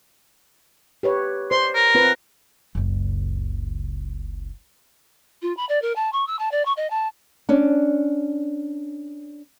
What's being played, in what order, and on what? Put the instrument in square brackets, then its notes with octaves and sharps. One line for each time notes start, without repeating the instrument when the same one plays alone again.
[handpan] G4 B4 C#5
[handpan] C5 D5 [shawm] C6
[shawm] A#4
[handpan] C4 F4 B4
[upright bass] F#1 C#2
[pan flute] F4
B5
D5
A#4
A5
C#6
E6
A5
D5
C#6
D#5
A5
[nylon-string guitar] C#4 D4